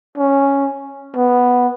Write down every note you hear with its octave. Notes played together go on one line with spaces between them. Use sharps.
C#4
B3